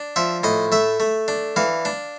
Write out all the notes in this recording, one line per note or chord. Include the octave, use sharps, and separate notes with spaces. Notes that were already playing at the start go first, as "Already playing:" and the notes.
Already playing: D4
F3 E5
A2 D#5
A3 E5
A3
D4
E3 F5
D4